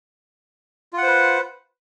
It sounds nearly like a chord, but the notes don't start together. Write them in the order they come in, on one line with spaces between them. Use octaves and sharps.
F4 F#5 C5 B4